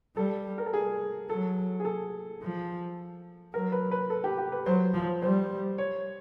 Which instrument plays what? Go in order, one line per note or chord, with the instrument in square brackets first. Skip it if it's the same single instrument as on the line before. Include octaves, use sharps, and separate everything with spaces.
[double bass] G3 [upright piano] A4
[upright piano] A#4
A4
G#4
[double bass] F#3 [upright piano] A4
[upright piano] G#4
A4
[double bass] F3
[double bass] F#3 [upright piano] A#4
[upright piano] B4
B4
A4
G4
G4
B4
[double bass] F#3 [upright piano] C5
[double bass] F3
[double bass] G3 [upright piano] C5
[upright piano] C#5